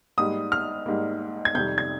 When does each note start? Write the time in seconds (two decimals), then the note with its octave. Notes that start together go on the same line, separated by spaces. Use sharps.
0.18 G#2 G3 A#3 D#6
0.52 F6
0.86 G#2 G3 A#3
1.45 G#6
1.54 F2 C3 D#3 G3 G6
1.78 G#6